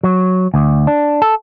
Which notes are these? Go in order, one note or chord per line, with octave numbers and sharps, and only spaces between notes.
F#3
D2
D4
A4